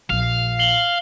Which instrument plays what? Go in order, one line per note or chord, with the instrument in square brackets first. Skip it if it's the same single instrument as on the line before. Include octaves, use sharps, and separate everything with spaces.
[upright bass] A#1 [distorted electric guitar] F5
[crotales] C7 F#7 G7